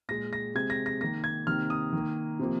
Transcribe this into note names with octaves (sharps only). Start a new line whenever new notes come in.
A#2 G#3 A#6
A#6
C3 G#3 G#6
A#6
A#6
D#3 A#3 A#6
G#6
C3 D#3 A#3 F6
D#6
D#3 A#3
C3 F3 A#3